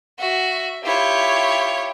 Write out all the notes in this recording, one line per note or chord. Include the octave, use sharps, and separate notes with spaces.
F#4 E5
E4 F4 G4 C#5